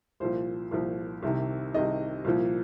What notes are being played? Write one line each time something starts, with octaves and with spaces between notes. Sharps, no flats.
C2 A#2 F3 C5
C2 A#2 F3
C2 C3 D#3
C2 C3 D#3 D#5
C2 A#2 F3